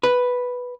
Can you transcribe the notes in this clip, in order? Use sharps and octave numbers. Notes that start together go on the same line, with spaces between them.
B4